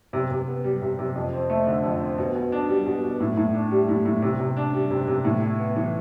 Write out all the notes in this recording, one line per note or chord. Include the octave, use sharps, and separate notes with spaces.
C3
C3
B3
G3
C3
C3
F2
C4
A3
D3
F2
C4
B2
B2
D4
G3
B2
B2
A2
A2
D4
G3
A2
A2
C3
C3
D4
G3
C3
C3
A2
E4
B3
E3